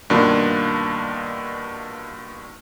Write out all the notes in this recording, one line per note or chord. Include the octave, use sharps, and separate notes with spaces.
G2 B2 D#3 A#3 D4 F4